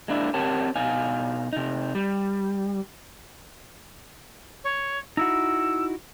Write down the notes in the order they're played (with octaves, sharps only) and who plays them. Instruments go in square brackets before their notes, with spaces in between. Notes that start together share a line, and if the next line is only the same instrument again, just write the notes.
[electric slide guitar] G#3 A#3 D4 E4
C4 G4 A#4 C#5 F#5 A5
B2 D#4 F5 G#5
C3 D#4
G3
[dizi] C#5
[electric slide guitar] D#4 E4 F#4 [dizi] E6